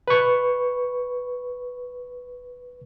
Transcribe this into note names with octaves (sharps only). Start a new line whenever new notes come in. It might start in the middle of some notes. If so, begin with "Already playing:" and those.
B4 C#6